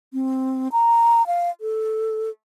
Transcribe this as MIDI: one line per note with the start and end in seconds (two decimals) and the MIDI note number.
0.13 0.68 60
0.72 1.25 82
1.27 1.50 77
1.61 2.29 69